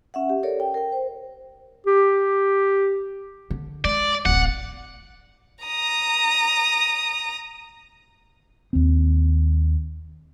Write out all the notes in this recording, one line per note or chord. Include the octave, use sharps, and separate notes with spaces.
C#4 E5 F#5
G4
G4 A4 A#4 C#5 D5
G5
A#4 G5
C5
G4
D3
G#3 D5
D1 A1 F#5
A#5 D#6
D#2 C4